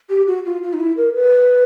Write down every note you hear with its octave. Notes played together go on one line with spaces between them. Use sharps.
G4
F#4
F4
F4
D#4
E4
A#4
B4